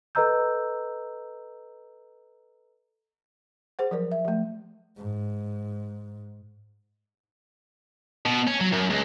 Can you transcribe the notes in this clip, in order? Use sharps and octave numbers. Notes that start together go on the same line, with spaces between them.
A4 B4 D#5 A#5 E6 G6
G#4 C5 F#5
F3 F#3 A#4 D5
E5
F3 A3
G#2
B2
C#4
F#3
F#2
C#2